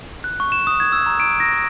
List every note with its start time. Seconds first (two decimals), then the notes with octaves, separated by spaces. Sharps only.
0.24 F#6
0.40 C#6
0.52 E7
0.67 D#6
0.80 G#6
0.92 E6
1.06 A#5
1.20 D7
1.40 A#6
1.53 A#6